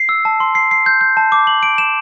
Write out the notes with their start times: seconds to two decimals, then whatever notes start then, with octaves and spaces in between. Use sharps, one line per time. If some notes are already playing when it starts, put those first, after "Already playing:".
Already playing: C7
0.09 E6
0.25 A5
0.40 C6
0.55 C7
0.71 C7
0.86 G6
1.01 G6
1.17 A5
1.32 D6
1.47 F#7
1.63 D7
1.78 E7